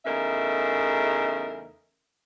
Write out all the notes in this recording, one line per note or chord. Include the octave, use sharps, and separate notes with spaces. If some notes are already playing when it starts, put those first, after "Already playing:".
E2 C#3 A3 D#4 A#4 E5